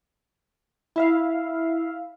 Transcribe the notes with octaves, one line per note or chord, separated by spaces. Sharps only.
E4 E5 F5